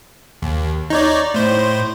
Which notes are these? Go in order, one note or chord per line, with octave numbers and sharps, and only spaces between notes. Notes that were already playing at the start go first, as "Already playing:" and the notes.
D#2
D#4 C#5 D5
A2 C5